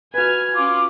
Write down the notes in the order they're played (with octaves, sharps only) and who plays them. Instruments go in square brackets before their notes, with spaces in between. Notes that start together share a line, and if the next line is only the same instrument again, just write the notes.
[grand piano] F#4 B4 [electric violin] G#5 F6 [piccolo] G#6
[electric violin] C#4 F4 [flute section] D6